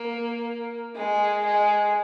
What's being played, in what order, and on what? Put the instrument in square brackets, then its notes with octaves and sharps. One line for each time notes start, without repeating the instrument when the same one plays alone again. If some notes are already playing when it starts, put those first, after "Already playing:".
Already playing: [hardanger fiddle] A#3
G#3
G#3